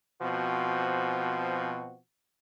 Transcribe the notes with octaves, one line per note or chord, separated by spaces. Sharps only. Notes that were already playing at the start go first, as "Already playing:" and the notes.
B2 F3 C4 F#4